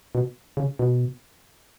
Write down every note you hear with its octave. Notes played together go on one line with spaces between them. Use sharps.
B2
C#3
B2